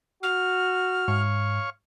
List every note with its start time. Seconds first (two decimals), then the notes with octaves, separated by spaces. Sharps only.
0.23 F#4 F6
1.08 G#2 C#5 F5 C#6